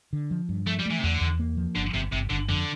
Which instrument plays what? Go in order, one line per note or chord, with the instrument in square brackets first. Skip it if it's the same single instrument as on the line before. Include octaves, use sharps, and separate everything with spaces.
[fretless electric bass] D3
F3
G2
[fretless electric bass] F3 [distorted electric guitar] A3
[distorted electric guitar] G3
[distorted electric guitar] E3 [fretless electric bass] A3
[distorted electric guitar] C3
[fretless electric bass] E2 [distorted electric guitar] D3
[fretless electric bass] E2
A#3
F3
[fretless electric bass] G1 [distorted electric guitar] D3
[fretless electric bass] G1 [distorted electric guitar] C3
[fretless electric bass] G1 [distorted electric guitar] C3
[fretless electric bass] G1 [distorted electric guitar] D3
[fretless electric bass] F2 [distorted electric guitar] D3